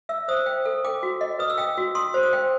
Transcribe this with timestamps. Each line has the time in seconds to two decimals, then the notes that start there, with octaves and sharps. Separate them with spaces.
0.09 E5 E6
0.28 C5 D#6
0.46 G5
0.66 A4
0.85 G5 D6
1.03 F#4
1.21 D#5
1.39 B4 D#6
1.50 E6
1.58 G5 D#6
1.78 F#4
1.95 C6 D#6
2.14 C5
2.23 D#6
2.33 G5